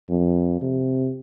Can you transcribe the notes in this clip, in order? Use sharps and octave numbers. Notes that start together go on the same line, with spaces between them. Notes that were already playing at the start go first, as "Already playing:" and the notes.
F2
C3